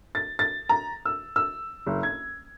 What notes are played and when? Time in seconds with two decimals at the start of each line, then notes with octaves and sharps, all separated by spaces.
0.15 A6
0.39 A6
0.69 A#5
1.05 E6
1.36 E6
1.87 F#1
2.03 G#6